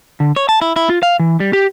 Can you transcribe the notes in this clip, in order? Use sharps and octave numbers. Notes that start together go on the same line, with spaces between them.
D3
C#5
A5
E4
E4
F4
F5
E3
G3
G4